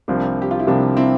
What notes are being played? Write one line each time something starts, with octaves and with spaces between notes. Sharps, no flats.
C2 C3 F3 A#3 D4
G4
F4
E4
C2 C3 F3 A#3 D4
C4 E4